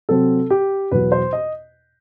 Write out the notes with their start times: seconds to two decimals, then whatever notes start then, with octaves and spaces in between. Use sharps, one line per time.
0.09 C3 F#3 C4 A4
0.50 G4
0.91 E2 B2 F#3 B4
1.12 C5
1.33 D#5